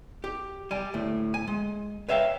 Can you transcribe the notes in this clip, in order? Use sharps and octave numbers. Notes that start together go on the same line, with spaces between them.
G4
G3 G#5
D2 A2
G#5
G#3
B4 C#5 E5 F5 G5